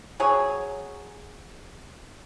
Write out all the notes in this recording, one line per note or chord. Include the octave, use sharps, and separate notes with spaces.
F#3 G#4 C#5